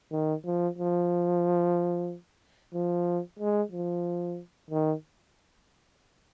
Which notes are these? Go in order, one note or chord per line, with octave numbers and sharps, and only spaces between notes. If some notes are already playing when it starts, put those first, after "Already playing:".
D#3
F3
F3
F3
G#3
F3
D#3